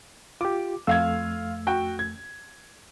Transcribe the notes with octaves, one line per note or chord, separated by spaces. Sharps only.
F4 G4 D6
F2 A3 F4 F5 E6 G#6
F#4 G5
G#6